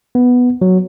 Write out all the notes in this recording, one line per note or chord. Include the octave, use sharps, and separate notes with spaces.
B3
F#3